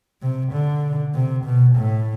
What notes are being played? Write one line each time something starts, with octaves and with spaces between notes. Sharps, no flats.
C3
D3
C3
B2
A2